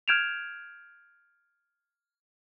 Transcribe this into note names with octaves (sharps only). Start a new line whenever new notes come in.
F6 G6 G#6 D7 E7 F7